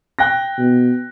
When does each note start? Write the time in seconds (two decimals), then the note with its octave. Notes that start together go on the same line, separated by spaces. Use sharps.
0.19 G5 F#6 A#6
0.58 B2